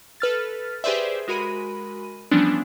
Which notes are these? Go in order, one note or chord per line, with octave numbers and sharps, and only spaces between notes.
A4 B4 F6 A6
G4 G#4 B4 C5 D5 E5
G#3 F#4 A#4 B5 D#7
E3 F3 G3 B3 C#4 D4